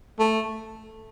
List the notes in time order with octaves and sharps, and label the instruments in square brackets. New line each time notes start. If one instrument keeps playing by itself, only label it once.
[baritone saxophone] A3